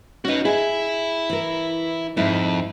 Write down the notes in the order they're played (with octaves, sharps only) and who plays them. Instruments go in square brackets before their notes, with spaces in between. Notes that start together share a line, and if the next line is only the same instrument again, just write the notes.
[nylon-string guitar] C#4 D#4 [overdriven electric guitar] F#4 B4
[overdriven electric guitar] E4 E5 [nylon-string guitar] G#4
[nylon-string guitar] E3 A#4
[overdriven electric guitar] F2 [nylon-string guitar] G#2 D#4 E4